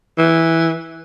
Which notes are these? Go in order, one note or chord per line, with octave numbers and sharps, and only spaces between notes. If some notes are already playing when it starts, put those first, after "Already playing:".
E3